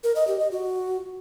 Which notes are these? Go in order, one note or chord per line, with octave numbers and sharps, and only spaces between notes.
A#4
D#5
G4
D#5
F#4